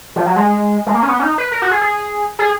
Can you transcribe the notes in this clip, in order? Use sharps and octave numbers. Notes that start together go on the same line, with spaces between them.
F3
F#3
G#3
G#3
A#3
C#4
B3
C#4
D#4
B4
A#4
F#4
G#4
G#4
G#4